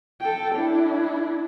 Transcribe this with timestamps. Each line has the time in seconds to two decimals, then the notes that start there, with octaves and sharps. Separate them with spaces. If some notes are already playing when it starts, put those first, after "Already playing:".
0.21 A4 G5
0.55 D4 E4